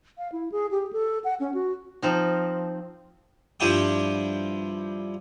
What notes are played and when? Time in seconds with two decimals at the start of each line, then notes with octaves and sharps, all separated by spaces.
0.18 F5
0.32 E4
0.52 G#4
0.71 G4
0.93 A4
1.24 F#5
1.40 C#4
1.54 F#4
2.02 F3 C4 D#4
3.60 G2 F3 E4 G4 G5 D#6